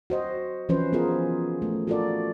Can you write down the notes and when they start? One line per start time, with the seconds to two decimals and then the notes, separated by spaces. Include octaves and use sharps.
0.10 F#4 C5 D#5
0.69 E3 F3 C#4 B4 C5
0.93 B3 F4 G#4 A#4
1.62 A3
1.87 F4 F#4 A4 A#4 D5